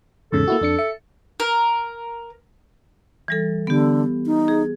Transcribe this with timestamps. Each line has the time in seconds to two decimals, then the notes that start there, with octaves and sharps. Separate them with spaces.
0.32 E2 G#2 C#3 A4
0.48 A#3 E4 F#4
0.61 F2 D4 C#7
0.78 E5 C#7
1.40 A#4
3.28 E3 G3 A4
3.67 D3 B3 G4
4.26 D#4
4.48 G#4